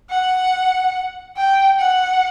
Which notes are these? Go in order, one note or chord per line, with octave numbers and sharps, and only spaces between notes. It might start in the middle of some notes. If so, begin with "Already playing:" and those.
F#5
G5
F#5